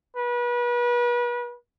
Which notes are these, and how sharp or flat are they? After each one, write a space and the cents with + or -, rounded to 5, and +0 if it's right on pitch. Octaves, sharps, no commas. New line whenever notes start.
B4 -35